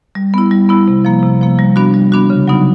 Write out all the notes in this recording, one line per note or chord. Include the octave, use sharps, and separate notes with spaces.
G3
B3 E4
G3
B3 E4
C3
F3 A#3
C3
F3 A#3
G3
B3 D4 F#4
G3
B3 D4 F#4
C#3
F#3 B3 D#4